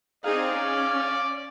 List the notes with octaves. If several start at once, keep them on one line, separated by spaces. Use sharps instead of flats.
C4 D#4 G#4 D5 F5
C#4